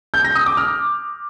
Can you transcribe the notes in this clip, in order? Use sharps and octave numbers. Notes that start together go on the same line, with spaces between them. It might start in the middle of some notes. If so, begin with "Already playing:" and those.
G6
A#6
D#6
D6
F6